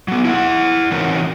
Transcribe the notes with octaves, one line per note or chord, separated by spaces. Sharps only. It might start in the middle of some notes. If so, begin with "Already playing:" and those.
F#3 B3
E4 F5 F#5
E3 C4 D#4 F#4 A#4 C#5